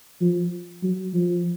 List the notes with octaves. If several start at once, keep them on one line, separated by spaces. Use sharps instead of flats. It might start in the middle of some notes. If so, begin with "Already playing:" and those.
F3
F#3
F3